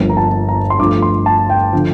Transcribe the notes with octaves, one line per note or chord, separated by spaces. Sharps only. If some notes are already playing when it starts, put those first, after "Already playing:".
Already playing: G1 G2 F3 A#3
A#5
A5
A#5
C6
G2 F3 A3 D6
C6
A5
G5
D3 F3